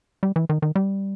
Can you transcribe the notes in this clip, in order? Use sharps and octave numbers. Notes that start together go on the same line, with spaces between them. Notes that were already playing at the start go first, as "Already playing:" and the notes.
G3
E3
D#3
D#3
G3